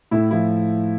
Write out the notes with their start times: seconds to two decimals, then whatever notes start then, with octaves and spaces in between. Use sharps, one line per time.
0.11 A2 E4
0.31 F3 E4